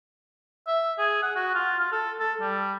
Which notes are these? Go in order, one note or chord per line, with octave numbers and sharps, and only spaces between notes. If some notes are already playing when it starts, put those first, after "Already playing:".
E5
G#4
F#5
F#4
F4
F4
A4
A4
G3